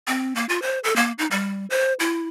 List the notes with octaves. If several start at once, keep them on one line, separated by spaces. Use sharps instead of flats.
C4
A#3
F4
C5
A4
A#3
D#4
G3
C5
E4